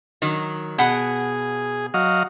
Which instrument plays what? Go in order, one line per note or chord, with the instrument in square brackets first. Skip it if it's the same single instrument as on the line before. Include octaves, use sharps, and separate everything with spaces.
[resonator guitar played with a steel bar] D#3 F#3
[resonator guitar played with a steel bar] B2 F#5 [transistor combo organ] G#4
[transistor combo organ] F#3 D#5 F5